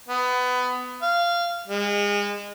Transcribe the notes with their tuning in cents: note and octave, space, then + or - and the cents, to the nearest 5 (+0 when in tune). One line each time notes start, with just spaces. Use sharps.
B3 +20
F5 -15
G#3 -30